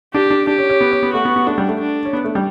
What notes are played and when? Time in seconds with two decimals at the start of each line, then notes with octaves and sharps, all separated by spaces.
0.14 D4 G4
0.30 D4
0.47 D4 G4
0.58 C#4
0.69 C#4
0.81 B3
0.92 C#4
1.03 B3
1.14 A3 F#4
1.25 B3
1.36 B3
1.46 A3 D4
1.58 G3
1.69 A3
1.80 D4
2.05 C#4
2.13 B3
2.24 A3
2.35 G3